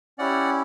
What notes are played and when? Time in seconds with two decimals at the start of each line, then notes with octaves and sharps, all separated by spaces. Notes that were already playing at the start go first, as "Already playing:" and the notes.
0.19 C#4 E4 G4 D5 F#5